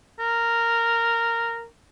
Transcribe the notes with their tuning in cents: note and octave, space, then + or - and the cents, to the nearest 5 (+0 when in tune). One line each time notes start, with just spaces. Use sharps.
A#4 -10